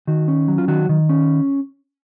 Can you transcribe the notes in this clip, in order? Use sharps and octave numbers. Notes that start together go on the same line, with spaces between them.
D#3 F#4
C#4
F#3
F4
D#3 F#4
D#3
C#4